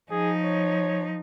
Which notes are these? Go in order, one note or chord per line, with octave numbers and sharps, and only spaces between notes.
F3 D#4 G#4
C#5